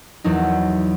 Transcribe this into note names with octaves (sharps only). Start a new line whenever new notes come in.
E2 E3 F#3 D#4